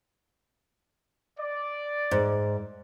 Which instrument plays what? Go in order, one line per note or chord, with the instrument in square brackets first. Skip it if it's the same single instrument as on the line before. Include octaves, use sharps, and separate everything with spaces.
[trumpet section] D5
[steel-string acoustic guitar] G#2